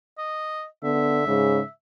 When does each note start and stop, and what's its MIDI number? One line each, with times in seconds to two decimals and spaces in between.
0.18 0.65 75
0.83 1.27 50
0.83 1.20 59
0.83 1.70 76
1.27 1.61 44
1.27 1.60 49